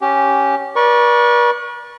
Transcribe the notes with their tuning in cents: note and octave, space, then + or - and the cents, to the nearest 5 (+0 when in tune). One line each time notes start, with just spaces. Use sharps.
C#4 +0 G4 -10
B4 -45 D5 +0 C#6 +0